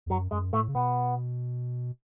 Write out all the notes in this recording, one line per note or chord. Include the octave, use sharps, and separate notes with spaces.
E2
F#2 F#3
F#2 G#3
A2 A3
C#3
B2 B3